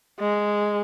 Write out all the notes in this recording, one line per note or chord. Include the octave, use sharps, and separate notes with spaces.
G#3